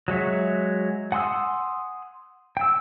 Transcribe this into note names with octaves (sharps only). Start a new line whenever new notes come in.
F#3 G#3 C#5 E5
F#5 G#5 C6 D#6 E6
G5 E6